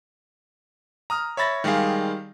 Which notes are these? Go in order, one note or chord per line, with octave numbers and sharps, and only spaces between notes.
A#5 D#6 F6
C#5 E5 B5 A6 A#6
D#3 G3 G#3 G#4 F5